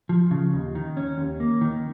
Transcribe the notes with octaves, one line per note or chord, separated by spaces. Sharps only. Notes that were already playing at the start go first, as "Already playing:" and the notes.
F3
C#3
D#2
D#3
C#4
D#2
A#3
D#3